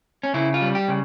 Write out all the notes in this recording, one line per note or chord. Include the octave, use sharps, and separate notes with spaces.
C#4
C#3 E4
F4
G3
G4
C#3